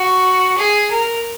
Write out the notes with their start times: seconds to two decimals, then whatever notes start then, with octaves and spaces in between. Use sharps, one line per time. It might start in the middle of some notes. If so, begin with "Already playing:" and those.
Already playing: F#4
0.58 G#4
0.90 A#4